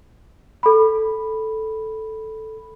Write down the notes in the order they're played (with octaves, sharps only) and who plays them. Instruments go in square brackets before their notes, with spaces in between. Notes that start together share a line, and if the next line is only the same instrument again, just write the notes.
[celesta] A4 B5